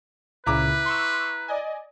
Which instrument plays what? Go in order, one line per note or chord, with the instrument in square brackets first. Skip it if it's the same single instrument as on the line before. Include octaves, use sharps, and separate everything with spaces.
[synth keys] C#2 A#2 C#3 [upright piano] E4 A#5 D6 [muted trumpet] B4
[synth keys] C6 C#6 E6
D5 D#5 G#5